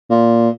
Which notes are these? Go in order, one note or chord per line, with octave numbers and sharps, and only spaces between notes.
A#2